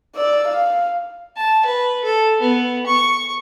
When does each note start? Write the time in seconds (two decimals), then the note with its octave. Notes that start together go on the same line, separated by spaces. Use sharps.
0.16 D5 E6
0.48 F5
1.37 A5
1.66 B4
2.04 A4
2.40 B3
2.86 C#6